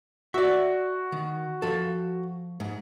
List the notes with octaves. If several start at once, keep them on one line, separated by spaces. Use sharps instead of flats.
F#4 D5 E5
D#3
F3 A4
G#2